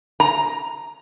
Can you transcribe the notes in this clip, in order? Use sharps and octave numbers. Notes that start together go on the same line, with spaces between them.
A#5